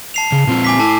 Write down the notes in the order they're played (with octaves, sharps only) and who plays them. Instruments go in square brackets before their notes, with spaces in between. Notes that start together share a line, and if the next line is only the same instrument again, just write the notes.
[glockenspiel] A5 C7 F7
[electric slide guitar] C#3
A#2 C4 F4
[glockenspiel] G#5 D6 B6
[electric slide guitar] E4 A4 [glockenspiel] A5